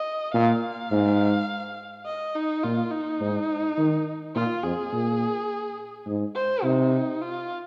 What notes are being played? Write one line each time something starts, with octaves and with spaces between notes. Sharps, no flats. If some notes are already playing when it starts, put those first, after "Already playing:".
Already playing: D#5
A#2 F5
G#2
D#5
D#4
A#2 F4
D#4
G#2
D#3
A#2 F4
F2 G#4
A#2
G#2
C5
C3 D#4
F4